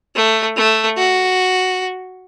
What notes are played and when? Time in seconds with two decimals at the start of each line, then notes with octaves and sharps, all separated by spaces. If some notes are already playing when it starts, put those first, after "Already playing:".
0.15 A3
0.56 A3
0.97 F#4